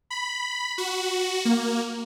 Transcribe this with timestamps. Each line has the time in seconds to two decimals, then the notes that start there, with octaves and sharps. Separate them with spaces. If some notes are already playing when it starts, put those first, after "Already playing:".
0.10 B5
0.78 F#4
1.45 A#3